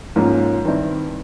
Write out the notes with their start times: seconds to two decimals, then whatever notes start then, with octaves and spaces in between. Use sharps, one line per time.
0.16 G#2 F3 A#3 C#4
0.65 G2 D#3 G3 C4 E4